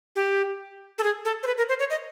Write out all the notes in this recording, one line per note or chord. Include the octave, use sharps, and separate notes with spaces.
G4
A4
G#4
A4
C5
B4
A#4
C5
C#5
D#5